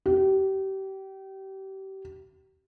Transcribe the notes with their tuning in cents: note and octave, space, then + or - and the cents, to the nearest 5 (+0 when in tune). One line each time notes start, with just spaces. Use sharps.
G4 -30